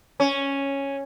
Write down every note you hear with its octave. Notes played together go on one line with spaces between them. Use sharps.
C#4